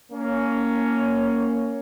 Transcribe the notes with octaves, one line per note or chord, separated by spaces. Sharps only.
A#3 C#4